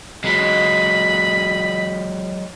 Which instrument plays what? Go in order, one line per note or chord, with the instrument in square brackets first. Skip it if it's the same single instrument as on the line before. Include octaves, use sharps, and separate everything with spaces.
[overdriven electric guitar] F#3 G#3 [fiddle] D#5 B5